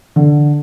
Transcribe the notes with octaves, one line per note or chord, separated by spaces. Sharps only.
D3